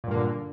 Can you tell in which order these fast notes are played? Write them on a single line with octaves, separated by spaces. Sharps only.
A#2 G2 A#3 D3